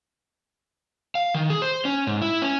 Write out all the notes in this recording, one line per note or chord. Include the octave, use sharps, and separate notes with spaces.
F5
D#3
G#4
C5
C#4
G#2
E4
C#4